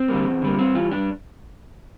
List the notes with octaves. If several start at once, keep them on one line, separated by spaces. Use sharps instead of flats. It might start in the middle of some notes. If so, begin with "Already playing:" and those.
Already playing: C4
D3 G3 A#3
E2
D3 G3 A#3
G2 C4
E3 G3 F4
G2 D4